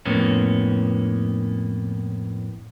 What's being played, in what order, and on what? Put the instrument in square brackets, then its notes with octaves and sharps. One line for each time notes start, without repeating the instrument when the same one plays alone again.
[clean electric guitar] F2 A2 A#3 B3 C#4